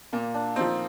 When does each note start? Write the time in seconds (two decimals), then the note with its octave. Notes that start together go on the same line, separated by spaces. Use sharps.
0.13 A#2 A#3
0.34 D4
0.56 F3 C4 D#4